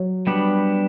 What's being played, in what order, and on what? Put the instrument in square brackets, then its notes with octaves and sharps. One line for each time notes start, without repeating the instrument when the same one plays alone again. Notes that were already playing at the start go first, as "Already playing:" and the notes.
Already playing: [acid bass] F#3
[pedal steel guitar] G3 B3 D4